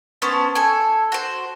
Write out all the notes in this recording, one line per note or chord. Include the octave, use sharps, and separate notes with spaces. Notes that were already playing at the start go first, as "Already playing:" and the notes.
B3 C#4 C5 A5
A4 G#5
F#4 C5